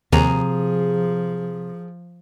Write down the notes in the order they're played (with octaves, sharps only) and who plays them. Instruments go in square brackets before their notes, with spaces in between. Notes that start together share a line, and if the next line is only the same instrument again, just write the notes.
[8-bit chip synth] D#2 [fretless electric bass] C3 [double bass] F3 [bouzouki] G#4 A#5